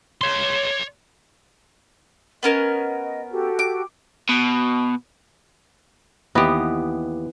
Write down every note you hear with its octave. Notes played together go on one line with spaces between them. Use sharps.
C#5 C6
B3 C#4 A#4 D#5
F#4 G4 A4
D6
B2
D#2 E3 B3 G4 D#5